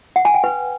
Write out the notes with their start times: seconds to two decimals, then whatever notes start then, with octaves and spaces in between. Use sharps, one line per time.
0.16 F#5
0.25 G#5
0.34 G5
0.44 B4